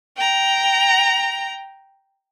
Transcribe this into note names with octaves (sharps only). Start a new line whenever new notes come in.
G5 A#5